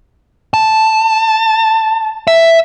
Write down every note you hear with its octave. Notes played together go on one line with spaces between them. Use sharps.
A5
E5